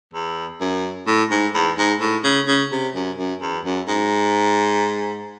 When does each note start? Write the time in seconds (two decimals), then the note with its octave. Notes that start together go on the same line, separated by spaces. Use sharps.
0.13 E2
0.60 F#2
1.07 A2
1.31 G#2
1.54 E2
1.78 G#2
2.00 A2
2.24 C#3
2.48 C#3
2.72 C3
2.95 F#2
3.18 F#2
3.42 E2
3.65 F#2
3.88 G#2